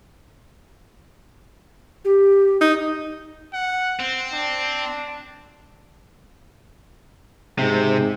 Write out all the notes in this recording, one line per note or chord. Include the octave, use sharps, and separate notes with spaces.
G4
D#4
F#5
C4
D4
G#2 C3